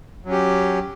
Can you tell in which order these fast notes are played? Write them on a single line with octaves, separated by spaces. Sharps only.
F#3 C#4 G4